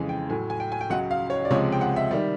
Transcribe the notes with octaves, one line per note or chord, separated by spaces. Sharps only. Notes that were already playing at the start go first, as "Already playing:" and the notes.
Already playing: F2 C#3 E3 G#3 G#5
G5
A2 F#3 G#5
G#5
G5
G#5
G5
C#2 C#3 F#3 F#5
F5
C#5
D5
C#2 C3 F3 G#3 C#5
G5
F#5
E5
D#3 G3